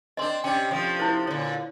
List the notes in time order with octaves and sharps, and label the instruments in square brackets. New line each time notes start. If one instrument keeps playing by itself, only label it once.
[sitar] C4 D4 [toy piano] D#5 C6
[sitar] C3 C#4 D4 [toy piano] G5
[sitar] C3 F3 A3
[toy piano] E4 C5
[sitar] A#2 D3 [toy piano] C#5